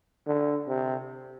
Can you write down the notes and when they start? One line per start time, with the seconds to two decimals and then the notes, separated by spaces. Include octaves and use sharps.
0.27 D3
0.68 C3